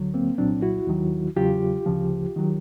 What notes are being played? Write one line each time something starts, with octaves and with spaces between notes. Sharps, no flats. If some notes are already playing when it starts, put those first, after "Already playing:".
Already playing: D2 D3 F#3
A#3 C4
C2 A#2 F#3 C4 D4
E4 F#4
D#2 D#3 F#3
E2 C#3 F#3 F4 G4
D2 C#3 F3
D#3 F#3